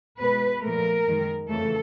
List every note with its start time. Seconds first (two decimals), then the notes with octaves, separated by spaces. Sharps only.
0.19 B2 G#3 B4
0.62 A#2 F3 A3 A#4
1.06 F#2 D#3 G#3
1.49 F2 C#3 E3 A3 A4